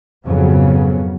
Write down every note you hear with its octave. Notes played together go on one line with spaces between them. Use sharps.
F2 G#2 C#3 F#3 B3